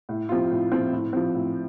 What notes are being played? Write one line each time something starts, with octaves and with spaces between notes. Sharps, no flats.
A2
F3 C4 F4
A2
F3 C4 F4
A2
F3 C4
A2